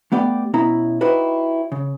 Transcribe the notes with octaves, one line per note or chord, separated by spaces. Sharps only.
A3 B3 G4 D5 G5
B2 C#4 E4 A#5
D#4 E4 F#4 G4 B4 C5
C#3